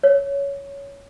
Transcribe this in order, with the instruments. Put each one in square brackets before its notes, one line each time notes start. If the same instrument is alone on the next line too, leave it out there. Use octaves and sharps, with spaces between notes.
[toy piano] C#5